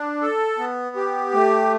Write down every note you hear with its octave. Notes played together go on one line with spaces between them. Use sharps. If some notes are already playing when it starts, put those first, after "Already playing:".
Already playing: D4
A4
B3
G4
A3